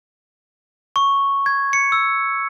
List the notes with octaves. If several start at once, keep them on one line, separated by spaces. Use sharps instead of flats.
C#6
G#6
C#7
E6